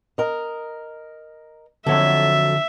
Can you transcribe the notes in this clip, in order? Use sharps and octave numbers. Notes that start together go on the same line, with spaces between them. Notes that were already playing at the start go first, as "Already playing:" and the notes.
A#4 D#5
F2 D3 F3 F#3 A4 E5